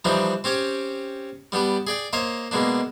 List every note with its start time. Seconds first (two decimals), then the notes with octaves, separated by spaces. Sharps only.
0.05 E3 F3 G3 D4 D#4
0.44 C4 C#4 G4 C#5
1.52 G3 B3 D4 G4
1.87 G#4 D5 G5
2.13 A#3 C5 C#5 D#5
2.51 B2 G#3 A#3 D4